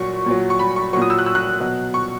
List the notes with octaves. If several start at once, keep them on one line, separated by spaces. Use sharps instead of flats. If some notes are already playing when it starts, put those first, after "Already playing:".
Already playing: A#2 F#3 C#6
A#2 F#3
C#6
B5
C#6
A#2 F#3 C#6 D#6
E6
F#6
E6
F#6
B2 F#3
C#6